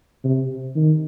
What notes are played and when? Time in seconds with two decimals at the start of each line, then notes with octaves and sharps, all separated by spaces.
0.24 C3
0.76 D#3